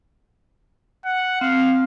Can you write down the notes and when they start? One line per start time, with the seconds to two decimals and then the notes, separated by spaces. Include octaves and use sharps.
1.05 F#5
1.41 C4 F5